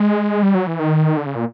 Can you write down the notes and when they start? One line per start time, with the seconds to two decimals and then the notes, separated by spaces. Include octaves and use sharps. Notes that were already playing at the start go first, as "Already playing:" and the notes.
Already playing: G#3
0.43 G3
0.55 F#3
0.67 E3
0.80 D#3
1.17 D3
1.26 C#3
1.35 A#2